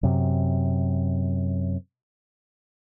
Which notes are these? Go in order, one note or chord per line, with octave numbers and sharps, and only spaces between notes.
F#2 C3